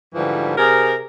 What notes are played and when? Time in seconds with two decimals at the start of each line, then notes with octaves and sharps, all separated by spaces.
0.15 G#2 D3 E3 F3 G3
0.58 C3 G#4 A#4